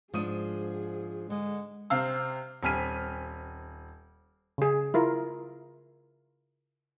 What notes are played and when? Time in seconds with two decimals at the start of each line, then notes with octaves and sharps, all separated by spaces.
0.14 G#2 F3 D4 G#4 D#6 D#7
1.30 D3 G#3
1.90 C3 C4 F5 E6
2.63 D#1 C4 G#5 F6 B6 D#7
4.58 C#3 G#4
4.94 E4 F4 A#4